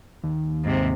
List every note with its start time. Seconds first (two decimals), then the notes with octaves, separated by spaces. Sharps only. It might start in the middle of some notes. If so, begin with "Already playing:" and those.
0.24 D#2
0.64 G#2 C3